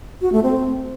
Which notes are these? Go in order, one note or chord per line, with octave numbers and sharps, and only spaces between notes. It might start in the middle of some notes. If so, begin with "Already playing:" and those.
F#4
A3
C4